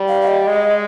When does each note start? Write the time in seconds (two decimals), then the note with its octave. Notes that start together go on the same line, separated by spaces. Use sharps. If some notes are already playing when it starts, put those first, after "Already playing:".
Already playing: G3
0.08 F5
0.22 F5
0.27 D#5
0.47 G#3 D#5